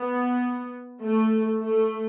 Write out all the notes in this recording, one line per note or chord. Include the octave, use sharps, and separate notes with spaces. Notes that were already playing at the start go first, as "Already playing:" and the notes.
Already playing: B3
A3
A3